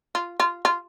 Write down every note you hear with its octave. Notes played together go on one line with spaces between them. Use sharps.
F4
F4
F4